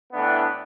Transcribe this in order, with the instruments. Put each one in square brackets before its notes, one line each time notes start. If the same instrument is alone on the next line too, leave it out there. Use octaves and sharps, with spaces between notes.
[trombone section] A2 E3 B3 D4